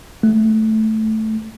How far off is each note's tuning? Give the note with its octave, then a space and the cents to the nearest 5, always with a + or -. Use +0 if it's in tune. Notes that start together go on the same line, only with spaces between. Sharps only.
A3 -5